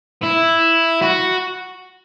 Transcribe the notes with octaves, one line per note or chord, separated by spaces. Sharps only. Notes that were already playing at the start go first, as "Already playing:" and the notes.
E4
F#4